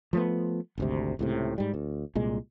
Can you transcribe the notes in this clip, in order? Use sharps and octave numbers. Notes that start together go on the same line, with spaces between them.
F3 A3 B3
G#1 D2 C3
C#2 A2 C3
G#2 G3
D2
C2 A#2 G#3